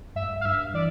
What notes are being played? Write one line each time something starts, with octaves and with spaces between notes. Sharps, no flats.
G2 E5
F5
G2 E5
E3 D5